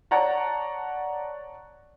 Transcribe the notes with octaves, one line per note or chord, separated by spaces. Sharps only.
C#5 D5 F#5 A5 A#5